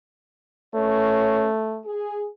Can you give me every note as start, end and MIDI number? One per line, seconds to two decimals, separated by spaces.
0.74 1.82 57
0.74 1.46 61
0.74 1.46 71
0.74 1.46 73
1.86 2.26 68